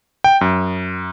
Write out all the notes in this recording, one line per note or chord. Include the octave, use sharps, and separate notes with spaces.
G5
F#2